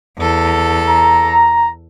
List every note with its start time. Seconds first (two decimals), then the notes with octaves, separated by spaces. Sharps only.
0.18 E2 A4
0.88 A#5